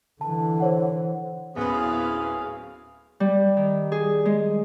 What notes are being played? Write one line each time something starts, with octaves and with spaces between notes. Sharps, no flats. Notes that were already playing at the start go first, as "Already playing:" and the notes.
D3 E3 A5
C5 C#5 F#5
D1 B3 C#4 E4 G#4 B4 F5
G3
D#3
G#4
G#3